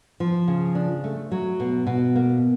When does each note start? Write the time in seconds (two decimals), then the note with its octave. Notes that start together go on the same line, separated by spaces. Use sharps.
0.20 F3
0.48 C#3
0.75 D4
1.04 A3
1.31 F#3
1.60 B2
1.87 B2
2.15 A#3